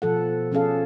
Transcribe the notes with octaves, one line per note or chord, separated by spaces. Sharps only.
B2 F3 A4 F#5
F3 C#4 G#4 A4 F5